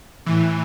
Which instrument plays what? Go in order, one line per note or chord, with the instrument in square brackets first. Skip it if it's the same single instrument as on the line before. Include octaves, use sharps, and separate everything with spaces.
[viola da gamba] A2 [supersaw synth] E3